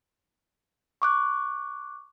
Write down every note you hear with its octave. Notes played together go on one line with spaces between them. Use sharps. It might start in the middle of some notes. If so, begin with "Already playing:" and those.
C#6 D6 F#6